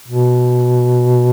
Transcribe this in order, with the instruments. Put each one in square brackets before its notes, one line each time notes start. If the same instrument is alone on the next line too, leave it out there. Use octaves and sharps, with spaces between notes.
[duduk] B2